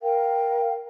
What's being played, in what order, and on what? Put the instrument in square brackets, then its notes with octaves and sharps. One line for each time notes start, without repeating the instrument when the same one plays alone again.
[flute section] A#4 F5 G5